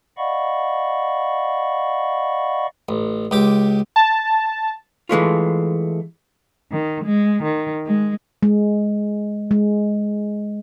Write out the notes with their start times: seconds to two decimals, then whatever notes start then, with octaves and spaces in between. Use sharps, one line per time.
0.17 D5 D#5 F5 F#5 B5 C#6
2.89 A1
3.31 C#2 G4 D6
3.96 A5
5.09 E3 G#3 A3 F4
6.72 D#3
7.04 G#3
7.43 D#3
7.86 G#3
8.43 G#3
9.51 G#3